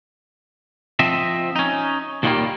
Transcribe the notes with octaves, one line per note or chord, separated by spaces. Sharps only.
F3 C4 D#5 E5
C#4 D#4
D#2 A#2 D#3 F3 G3 A#3